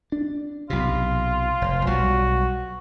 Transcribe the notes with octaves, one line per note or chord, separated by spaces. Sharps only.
D4
B1 C3 F4
F1
B1 G3 F#4